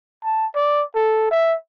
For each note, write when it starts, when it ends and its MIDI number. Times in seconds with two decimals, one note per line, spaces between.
0.24 0.46 81
0.55 0.83 74
0.95 1.26 69
1.31 1.54 76